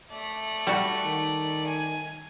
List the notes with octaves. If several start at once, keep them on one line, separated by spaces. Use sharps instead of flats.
A3 D5
G3 F#4
D#3
G#5